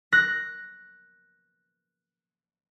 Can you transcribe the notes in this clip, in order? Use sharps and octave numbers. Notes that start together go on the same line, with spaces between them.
F#6 A#6